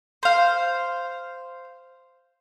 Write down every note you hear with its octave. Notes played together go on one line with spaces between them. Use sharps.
C5 F5